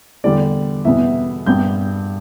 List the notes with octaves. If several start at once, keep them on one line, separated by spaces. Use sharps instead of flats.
E2 D3 G3 D5
E2 B2 G3 B3 E5
G2 G3 B3 G6